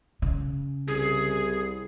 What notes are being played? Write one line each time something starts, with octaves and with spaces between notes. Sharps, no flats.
C#3
C2 G#4